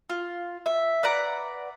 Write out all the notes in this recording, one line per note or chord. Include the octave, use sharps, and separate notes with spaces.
F4
E5
B4 D5 F#5 A#5